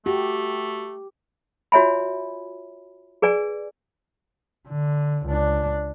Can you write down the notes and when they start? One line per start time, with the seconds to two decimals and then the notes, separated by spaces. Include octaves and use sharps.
0.06 A3 F#4 G4
1.72 F4 F#4 C#5 E5 G#5 B5
3.22 G#4 B4 D5 G#5
4.69 D3
5.26 C#2 D4